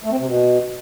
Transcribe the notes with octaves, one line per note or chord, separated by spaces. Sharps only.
A3
C4
C3
B2